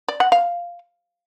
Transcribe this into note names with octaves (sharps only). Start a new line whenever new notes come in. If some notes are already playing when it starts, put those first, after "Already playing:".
D5
F#5
F5